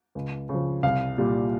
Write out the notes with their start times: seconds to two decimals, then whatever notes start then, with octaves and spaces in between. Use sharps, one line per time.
0.15 C#2
0.49 C#3
0.54 F3
0.83 C2 F5
1.18 A#2 G3